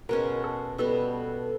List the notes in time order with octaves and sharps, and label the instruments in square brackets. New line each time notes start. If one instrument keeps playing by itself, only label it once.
[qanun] B2 G#3 C#4 [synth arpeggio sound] A#4
[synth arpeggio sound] A4
[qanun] B2 G3 B3 [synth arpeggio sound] A4